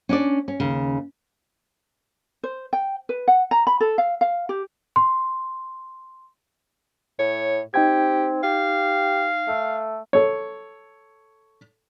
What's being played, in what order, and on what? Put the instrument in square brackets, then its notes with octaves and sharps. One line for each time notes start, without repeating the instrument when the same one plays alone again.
[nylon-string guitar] C#4 D4 D5
C#4
D#2 C#3
[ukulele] C5
G5
B4
F#5
A#5
B5
A4
F5
F5
G4
[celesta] C6
[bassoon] A2 [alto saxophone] C#5
[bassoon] C4 [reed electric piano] D#4 G5 G#6 [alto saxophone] G4
[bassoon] G4 [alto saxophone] F5
[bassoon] A3
[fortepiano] A4 C#5